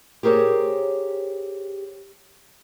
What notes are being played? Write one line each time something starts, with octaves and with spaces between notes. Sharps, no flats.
G4 G#4 A#4 C5 C#5